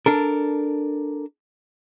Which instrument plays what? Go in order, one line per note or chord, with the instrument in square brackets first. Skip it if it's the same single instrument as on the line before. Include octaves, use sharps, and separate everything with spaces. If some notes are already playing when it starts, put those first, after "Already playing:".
[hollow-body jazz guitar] D4 A4 A#4